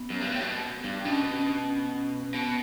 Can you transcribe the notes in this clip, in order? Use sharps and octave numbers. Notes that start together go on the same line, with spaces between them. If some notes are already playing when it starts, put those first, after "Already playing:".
Already playing: B3
F#2
G2
A2
B2
G2
D4
B2 C#4
B2 B3